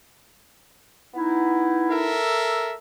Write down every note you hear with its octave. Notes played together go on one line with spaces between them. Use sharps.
B3 D#4 E4
A4 A#4 E5